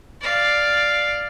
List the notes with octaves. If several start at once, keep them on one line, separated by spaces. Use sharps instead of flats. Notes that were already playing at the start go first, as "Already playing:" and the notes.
D5 F5